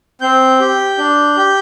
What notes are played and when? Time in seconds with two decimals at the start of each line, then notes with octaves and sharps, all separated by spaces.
0.21 C4 G6
0.60 G4
0.98 D4
1.37 G4